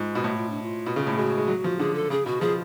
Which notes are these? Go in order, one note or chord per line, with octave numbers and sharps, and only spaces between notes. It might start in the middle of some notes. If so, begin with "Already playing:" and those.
Already playing: G#2 F4
B2
A2 F#4
F4
D4
F4
B2
C#3
A2
G#3 F#4
G#3
F#3
F3
D3 G#4
A4
C#3 G#4
B2 F#4
F3 G#4